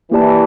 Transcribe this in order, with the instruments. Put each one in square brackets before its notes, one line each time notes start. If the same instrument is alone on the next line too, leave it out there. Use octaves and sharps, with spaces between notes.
[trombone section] E3 [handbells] A#3 E4 G4 D5 A5